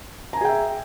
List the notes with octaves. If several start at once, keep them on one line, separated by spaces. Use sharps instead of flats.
G#4 E5 G5 G#5 A#5